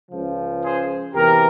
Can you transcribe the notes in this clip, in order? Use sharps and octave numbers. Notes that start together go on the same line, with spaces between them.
C#2 C#3 F3
G#4 C5
E2 C3 E3 G4 A#4